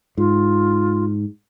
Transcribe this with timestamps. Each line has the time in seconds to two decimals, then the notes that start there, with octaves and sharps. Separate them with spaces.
0.18 G#2 F4